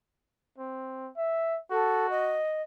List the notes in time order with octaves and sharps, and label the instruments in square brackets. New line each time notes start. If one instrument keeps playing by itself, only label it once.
[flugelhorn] C4
E5
[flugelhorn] F#4 [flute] A4
[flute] D#5